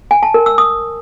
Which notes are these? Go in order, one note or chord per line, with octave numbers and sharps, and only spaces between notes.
G#5
A5
A#4
E6
D#6